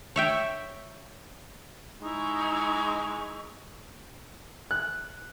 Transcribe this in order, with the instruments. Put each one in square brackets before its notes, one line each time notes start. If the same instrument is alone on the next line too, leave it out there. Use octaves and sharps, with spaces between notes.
[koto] C#5 E5 G5
[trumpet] G#3 [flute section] D#4 E4 C#6
[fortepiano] F#6